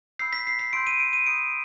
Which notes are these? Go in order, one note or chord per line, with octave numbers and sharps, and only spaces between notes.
B5 E6 G6 C7
B6
C7
C7
C6 E6 G6 D7
D#7
D7
D#7
B5 D#6 G6 D7